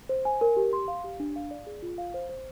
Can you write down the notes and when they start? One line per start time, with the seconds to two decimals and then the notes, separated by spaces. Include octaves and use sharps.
0.09 C5
0.25 G#5
0.41 A#4
0.57 G4
0.73 C6
0.88 F5
1.04 G4
1.20 D4
1.36 F5
1.51 D5
1.67 G#4
1.82 F4
1.98 F5
2.14 C5
2.29 C5